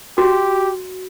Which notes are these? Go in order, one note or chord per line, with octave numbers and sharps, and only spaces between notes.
F#4 G4